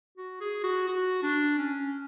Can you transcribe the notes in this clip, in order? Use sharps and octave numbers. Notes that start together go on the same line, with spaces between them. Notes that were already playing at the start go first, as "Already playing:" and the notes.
F#4
G#4
F#4
F#4
D4
C#4